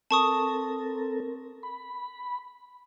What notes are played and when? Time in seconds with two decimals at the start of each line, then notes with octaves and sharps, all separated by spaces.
0.11 C4 A4 A#4 A5 C#6 D#6
1.63 B5